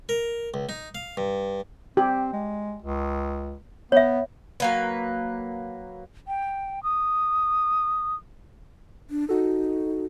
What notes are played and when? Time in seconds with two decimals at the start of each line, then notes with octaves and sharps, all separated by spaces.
0.09 A#4
0.54 C#2
0.69 D#4
0.95 F5
1.17 G2
1.97 C4 G4
2.33 G#3
2.82 C#2
3.92 B3 C#5 E5
4.60 F#3 A#3 B4
6.28 G5
6.84 D#6
9.10 D4
9.29 D#4 F#4 A4